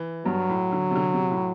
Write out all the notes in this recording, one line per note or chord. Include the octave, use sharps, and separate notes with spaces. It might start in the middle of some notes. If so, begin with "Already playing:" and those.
Already playing: E3
G2 F#3
A2
D3
C3
D3
C3
A2